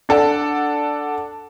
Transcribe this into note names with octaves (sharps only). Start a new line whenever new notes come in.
D4 A4 D5 F#5